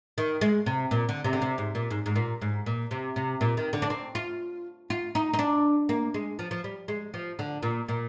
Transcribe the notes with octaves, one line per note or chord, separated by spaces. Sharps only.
D#3
G#3
C3
A#2
D3
C3
D3
C3
G#2
A#2
G#2
G#2
A#2
G#2
A#2
C3
C3
A#2
D#3
D3
D4
C4
F4
F4
D#4
D#4
D4
A#3
G#3
F3
F3
G3
G#3
F3
D3
A#2
A#2